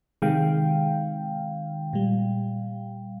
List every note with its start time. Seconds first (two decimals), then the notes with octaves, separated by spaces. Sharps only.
0.22 C3 D#3 G#3 F5 G5
1.93 A#2 G3